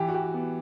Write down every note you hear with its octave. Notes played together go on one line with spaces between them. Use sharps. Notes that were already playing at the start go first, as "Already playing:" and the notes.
Already playing: E3 G4
F#4
G4
B3